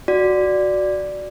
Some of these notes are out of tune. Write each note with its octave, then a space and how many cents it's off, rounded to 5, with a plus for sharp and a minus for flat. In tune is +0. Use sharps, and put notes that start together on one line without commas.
F#4 +0 D5 +0